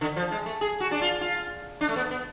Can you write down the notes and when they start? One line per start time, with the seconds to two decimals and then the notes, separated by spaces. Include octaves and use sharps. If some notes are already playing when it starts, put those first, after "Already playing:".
0.01 D3
0.16 F3
0.31 G#3
0.46 A3
0.61 G#4
0.80 F#4
0.91 D4
1.01 F4
1.21 F4
1.81 D4
1.89 A3
1.96 B3
2.11 B3